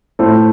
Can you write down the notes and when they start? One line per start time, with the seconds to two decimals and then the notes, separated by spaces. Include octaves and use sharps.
0.19 A2 A3 E4 C5